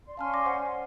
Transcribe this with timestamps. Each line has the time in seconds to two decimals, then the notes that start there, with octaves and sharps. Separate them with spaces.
0.05 D5 C6
0.17 C#4 F5 G#5 A5 C6 F6
0.34 D5 D6 A#6
0.45 C5 F#5